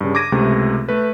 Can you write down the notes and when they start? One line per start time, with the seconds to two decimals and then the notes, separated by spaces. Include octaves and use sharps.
0.01 G2 C#3
0.15 D6 G#6 A#6 D#7
0.32 C#2 C3 A3
0.89 A3 B4